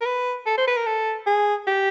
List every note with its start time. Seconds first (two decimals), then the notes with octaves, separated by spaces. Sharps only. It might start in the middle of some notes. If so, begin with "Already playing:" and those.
0.01 A#4
0.06 B4
0.46 A4
0.58 C5
0.67 B4
0.77 A#4
0.86 A4
1.26 G#4
1.67 G4